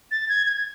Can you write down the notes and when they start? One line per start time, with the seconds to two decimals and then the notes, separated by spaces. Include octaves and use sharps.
0.11 A6
0.29 G#6
0.47 G#6